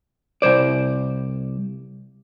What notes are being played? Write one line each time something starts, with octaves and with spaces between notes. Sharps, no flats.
C2 F2 C5 D5